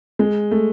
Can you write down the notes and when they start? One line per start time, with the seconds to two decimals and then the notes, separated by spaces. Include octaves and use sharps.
0.19 G#3
0.51 A3